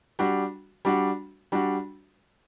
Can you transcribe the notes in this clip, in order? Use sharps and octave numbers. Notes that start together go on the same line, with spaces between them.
G3 D4 F#4
G3 D4 F#4
G3 D4 F#4